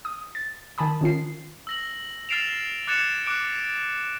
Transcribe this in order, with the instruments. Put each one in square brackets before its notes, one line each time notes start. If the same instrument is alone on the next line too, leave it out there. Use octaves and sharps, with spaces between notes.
[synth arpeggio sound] D#6
A6
D#3 G#5 A5 B5 D#6
D#3 C#4 F4 C7
[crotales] E6 A#6 F#7
F6 A6 C7 D7 E7 F7
D6 F#6 G#6 A6 C#7 E7
D6 F#6 D7